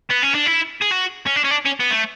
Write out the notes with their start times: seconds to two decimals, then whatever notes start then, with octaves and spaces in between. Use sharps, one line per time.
0.11 B3
0.23 C#4
0.35 D4
0.47 E4
0.82 G#4
0.92 F#4
1.26 C#4
1.36 D4
1.44 C#4
1.51 D4
1.65 C#4
1.80 B3
1.91 A3